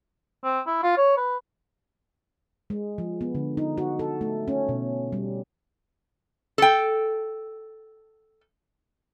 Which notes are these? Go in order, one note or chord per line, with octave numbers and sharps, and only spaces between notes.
C4
E4
F4
C#5
B4
G#3
F3
B3
D3
D#4
F#4
A4
A3
C#4
B2
G3
A4 G5